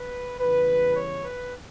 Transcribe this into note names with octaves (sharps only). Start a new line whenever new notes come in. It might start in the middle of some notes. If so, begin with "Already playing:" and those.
Already playing: B4
E2 C#3 E3 G3 B4
C#5
B4